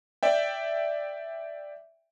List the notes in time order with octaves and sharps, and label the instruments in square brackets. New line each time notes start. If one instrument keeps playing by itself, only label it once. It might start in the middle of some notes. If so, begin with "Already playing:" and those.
[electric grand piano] D5 E5 G5